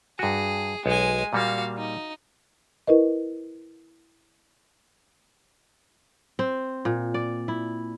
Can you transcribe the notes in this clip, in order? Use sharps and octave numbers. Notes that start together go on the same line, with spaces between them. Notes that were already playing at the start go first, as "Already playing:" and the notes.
G2 F#4 G#4
B1 G#3 C#5 G#5
A#2 G3 A#3 F#4 F5
D#4
E4 A#4 B4 D#5
C4
A#2
D5
E4